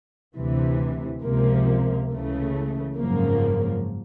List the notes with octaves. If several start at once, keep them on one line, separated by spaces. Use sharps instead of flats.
D2 C3 E3
C#2 C3 F3 A#3
C#2 C#3 E3 A3
G#1 F#2 C#3 F3 A#3